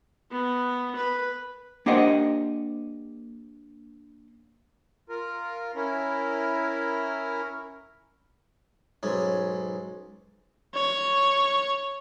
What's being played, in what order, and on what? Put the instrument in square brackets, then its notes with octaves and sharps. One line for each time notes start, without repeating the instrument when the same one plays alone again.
[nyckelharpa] B3
B4
[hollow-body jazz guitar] A#3 D4 G4 C5 D#5 F#5
[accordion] F4 A#4
C#4 E4 A#4
[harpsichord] B1 G#2 C#4
[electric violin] C#5